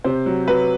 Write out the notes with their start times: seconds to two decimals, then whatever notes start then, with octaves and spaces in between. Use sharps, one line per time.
0.04 C3 C5
0.26 F#3
0.48 F#3 B4